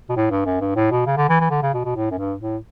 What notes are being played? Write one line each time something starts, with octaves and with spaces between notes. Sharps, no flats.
B2
A2
G2
F#2
G2
A2
B2
C#3
D3
E3
E3
D3
C#3
B2
B2
A2
F#2
G2
A2